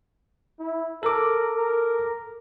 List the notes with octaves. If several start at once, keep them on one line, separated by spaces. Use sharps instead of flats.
E4
A4 A#4 D6
A#4